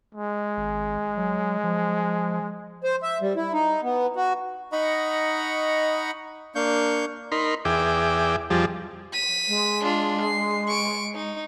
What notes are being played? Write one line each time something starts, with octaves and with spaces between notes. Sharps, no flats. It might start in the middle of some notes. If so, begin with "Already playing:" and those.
G#3
G#1
F#3
F3
C5
E5
G3
E4
D#4
B3
F#4
D#4 D#5 F#5 A#5 B5 C#6
A#3 D4 F5 C#6 G6
D#4 A#4 B5 C6
E2 G#4 E5 G5 D6
F2 F3 G3 G4 G#4 A5
B6 D#7
G#3
D4 F4
C7
C#6 D7
D#4